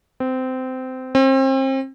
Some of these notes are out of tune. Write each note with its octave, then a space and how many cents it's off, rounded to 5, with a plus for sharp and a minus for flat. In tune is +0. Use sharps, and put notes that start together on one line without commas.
C4 -20
C4 +35